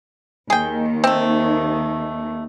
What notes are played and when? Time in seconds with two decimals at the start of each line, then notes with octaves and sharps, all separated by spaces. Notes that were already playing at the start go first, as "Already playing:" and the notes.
0.50 D#2 D#3 G#4 G5
1.04 A3 C4